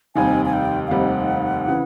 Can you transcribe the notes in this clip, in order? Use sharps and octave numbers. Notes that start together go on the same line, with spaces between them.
F1 D#2 D#3 G3 C4 G#5
G#5
G5
F5
F1 D#2 D#3 G3 C4 F#5
C#3 E3